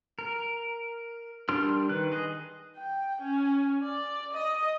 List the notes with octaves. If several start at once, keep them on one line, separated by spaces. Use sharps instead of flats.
A#4
G3 D4 A#4 C6 F6
D#3 B4 F#6
G#4 D#5
G5
C#4
D5
D#5